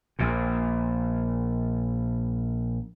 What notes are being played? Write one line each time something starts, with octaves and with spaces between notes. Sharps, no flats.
A#1 A#2